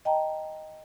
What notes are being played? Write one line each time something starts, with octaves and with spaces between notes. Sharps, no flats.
D#5 G5 A5 A#5